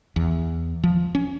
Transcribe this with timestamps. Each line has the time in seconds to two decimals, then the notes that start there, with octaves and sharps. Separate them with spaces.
0.16 E2
0.83 F3
1.15 C#4